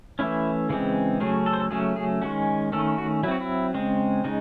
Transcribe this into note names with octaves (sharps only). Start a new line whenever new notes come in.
E3 A3 C#4 E4
C#3 E3 G#3 C4
C#3 F#3 A3 C#4 G#4
A4
C5
A4
C#3 F#3 A3 C#4 G#4
G#4
D#3 G#3 C#4 F#4
D#3 A3 C#4 A4
F#4
F#3 C4 E4 F#4
E4
C#3 G#3 C4
C#3 G#3 D#4